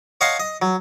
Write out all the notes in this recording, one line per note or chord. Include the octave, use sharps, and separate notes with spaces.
C#5 D#5 F5 F#5 A5 C6
D#5
F#3